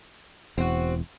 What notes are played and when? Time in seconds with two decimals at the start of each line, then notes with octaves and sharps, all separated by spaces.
0.58 E1 E2 C4 F#4